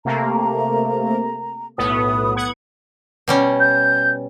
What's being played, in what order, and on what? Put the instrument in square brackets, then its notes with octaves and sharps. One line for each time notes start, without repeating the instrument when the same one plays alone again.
[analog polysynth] C3 A3 A#3 [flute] A#5
[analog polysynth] B1 A2 B3 [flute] D#6
[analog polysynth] B3 F#5 G#6 [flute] D#6
[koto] B2 G3 C#4
[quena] G6